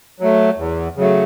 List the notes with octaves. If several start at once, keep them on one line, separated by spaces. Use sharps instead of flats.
F#3 A3
E2
C#3 F#3 A3